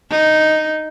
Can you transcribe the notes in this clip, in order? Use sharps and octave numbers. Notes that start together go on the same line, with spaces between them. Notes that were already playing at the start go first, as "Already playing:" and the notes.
D#4